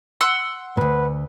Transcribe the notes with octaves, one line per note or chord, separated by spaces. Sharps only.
F#5 C6 E6
D2 G#2 B4